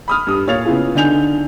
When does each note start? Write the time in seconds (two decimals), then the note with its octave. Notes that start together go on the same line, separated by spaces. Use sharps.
0.08 B5 D#6 F6
0.27 G2 D#6
0.47 A#2 C#5 F5 A6 F7
0.65 C#3 B3 E4 F4 G#4
0.95 D3 D4 D#4 G#5 G6 F7